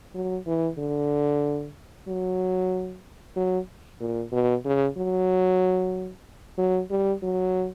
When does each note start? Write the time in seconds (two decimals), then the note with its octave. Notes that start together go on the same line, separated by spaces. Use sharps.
0.15 F#3
0.47 E3
0.78 D3
2.08 F#3
3.36 F#3
4.01 A#2
4.32 B2
4.65 C#3
4.98 F#3
6.58 F#3
6.90 G3
7.23 F#3